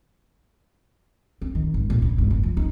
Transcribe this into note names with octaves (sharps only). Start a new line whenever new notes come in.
C4
D#3
G#1
A#2
C#3
G#2
F1
F3
D#4